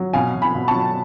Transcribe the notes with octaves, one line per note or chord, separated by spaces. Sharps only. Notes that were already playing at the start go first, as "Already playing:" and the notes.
Already playing: F#3
B2 F5 G#5
B2
G#5 B5
B2
A5 C#6
F#3